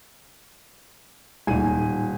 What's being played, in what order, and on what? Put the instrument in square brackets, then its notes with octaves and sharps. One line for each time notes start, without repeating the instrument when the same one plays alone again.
[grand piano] D#1 D#7 [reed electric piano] A2 D#4 G#5